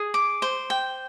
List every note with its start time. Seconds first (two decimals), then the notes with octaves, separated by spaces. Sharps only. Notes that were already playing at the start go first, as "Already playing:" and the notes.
Already playing: G#4
0.14 D6
0.42 C5
0.70 G5